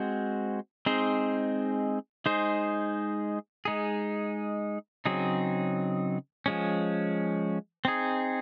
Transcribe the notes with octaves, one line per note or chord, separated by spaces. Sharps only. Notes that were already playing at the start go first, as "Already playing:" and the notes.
Already playing: G#3 C4 F#4 C5
G#3 C4 D#4 G#4 C5
G#3 D#4 G#4 C5
G#3 D#4 G#4
C#3 F#3 C4 D#4 G#4
F3 G#3 C#4
C4 D#4 G#4